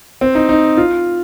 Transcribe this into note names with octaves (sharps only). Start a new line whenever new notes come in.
C4
D#4
D#4
F4